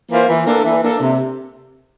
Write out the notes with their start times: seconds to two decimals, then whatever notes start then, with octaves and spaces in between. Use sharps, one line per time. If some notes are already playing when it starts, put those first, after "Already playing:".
0.11 E3 A#3 F4 C5
0.28 E3
0.46 A#3 D4 A4
0.64 E3
0.83 A#3 D4 A4
1.00 C3